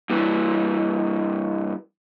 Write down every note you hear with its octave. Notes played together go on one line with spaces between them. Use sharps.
G2 E3